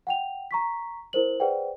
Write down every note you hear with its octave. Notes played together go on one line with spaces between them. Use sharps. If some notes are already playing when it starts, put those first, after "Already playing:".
F#5 G5 F7
A#5 C#6 B6
E4 A#4 C5 F#7
G#4 B4 C5 D5 F#5 G5